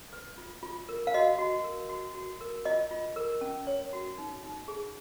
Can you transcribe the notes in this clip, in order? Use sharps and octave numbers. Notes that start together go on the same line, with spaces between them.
B4
F4
F4
A#4
F5
F#4 D#5
F#4
A#4
F#4
F#4
A#4
F4 D#5
F4
A#4
C#4
C#5
F#4
D#4
D#4
G#4